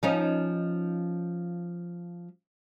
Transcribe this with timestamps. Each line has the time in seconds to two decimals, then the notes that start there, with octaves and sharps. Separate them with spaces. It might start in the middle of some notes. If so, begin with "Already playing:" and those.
0.03 F3 C#4 D#4